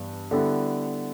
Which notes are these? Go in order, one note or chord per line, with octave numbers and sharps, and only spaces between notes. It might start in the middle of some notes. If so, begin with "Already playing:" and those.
Already playing: G2 E3 B3
D3 G3 B3 E4 A4